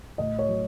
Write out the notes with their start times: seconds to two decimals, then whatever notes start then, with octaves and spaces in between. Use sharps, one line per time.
0.18 A2 D#5
0.39 C#5
0.49 F#3